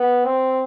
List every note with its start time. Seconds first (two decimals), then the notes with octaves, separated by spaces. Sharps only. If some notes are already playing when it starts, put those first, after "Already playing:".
Already playing: B3
0.25 C4